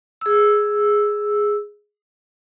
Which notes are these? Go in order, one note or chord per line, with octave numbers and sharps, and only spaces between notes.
G#4 E6